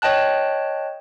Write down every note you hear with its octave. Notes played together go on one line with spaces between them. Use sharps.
C#5 D#5 G5 A5 F#6